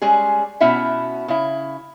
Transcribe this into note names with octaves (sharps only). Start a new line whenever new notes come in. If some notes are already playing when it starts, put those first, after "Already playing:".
G3 G#3 C#4 G#4
B2 C#4 E4 E5 F#5
C#3 E4